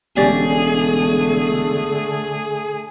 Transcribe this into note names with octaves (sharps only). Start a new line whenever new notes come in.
E1 D3 A3 C#4 G4 G#4 D5